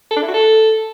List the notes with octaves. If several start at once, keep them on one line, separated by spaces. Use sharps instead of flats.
A4
D4
E4
F#4
A4